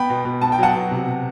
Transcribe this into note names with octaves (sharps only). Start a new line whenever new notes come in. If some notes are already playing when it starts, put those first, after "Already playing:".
Already playing: B3 G5 B5
B2
B2
B3 A5
G5
F#3 F#5 A5
B2
C3
C3